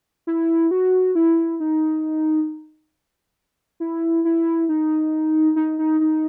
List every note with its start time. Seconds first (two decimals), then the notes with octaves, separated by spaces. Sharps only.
0.27 E4
0.71 F#4
1.15 E4
1.60 D#4
3.80 E4
4.25 E4
4.69 D#4
5.56 D#4
5.79 D#4
6.00 D#4